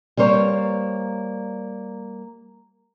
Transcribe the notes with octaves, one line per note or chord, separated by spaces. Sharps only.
G3 A#3 C5 C#5